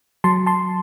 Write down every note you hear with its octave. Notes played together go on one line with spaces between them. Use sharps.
F#3 A5 C6
A5 C6